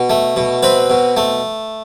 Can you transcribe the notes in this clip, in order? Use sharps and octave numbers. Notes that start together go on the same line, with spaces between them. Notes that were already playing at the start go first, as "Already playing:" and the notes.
Already playing: B2
A3
B2
C4 B4
B2
A3